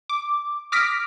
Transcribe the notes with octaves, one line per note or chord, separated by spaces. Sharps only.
D6
D6 D#6 F6 A#6 B6 D7